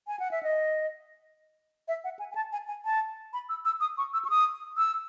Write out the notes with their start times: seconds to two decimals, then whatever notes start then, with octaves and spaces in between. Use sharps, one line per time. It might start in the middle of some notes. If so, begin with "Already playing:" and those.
0.07 G#5
0.20 F#5
0.31 E5
0.43 D#5
1.88 E5
2.04 F#5
2.19 G#5
2.31 G#5
2.35 A5
2.52 G#5
2.68 G#5
2.85 A5
3.33 B5
3.49 E6
3.65 E6
3.81 D#6
3.98 C#6
4.13 E6
4.25 C#6
4.30 D#6
4.77 E6